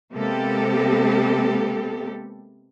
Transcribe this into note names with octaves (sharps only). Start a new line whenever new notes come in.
C3 G#3 A#3 B3 G4 A4